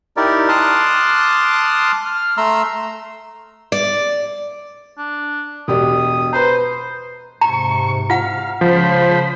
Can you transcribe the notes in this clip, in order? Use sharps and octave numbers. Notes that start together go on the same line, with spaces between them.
D#4 E4 G4 A#4 D5
A5 C6 D6 D#6 F6 F#6
F6
A3 A#5 C6 E6
D5
D4
E1 G4 D5 D#6
B4 C5 A#5
G#2 C3 A#5 C#6
F4 F5 F#5
C#2 C#3 F3 C5 B5